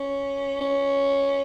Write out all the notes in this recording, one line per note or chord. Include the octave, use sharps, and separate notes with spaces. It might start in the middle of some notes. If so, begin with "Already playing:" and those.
Already playing: C#4
C#4